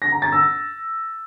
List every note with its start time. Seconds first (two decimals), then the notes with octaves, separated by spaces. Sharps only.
0.02 A#6
0.12 A#5
0.22 A6
0.32 E6